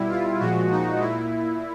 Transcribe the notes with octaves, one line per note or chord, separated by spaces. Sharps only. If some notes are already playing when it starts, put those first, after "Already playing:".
Already playing: B2 G3 E4
F4
A#2 F3 G#3 F#4
D#4
A#2 E4